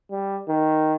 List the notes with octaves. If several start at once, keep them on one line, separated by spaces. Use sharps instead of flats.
G3
D#3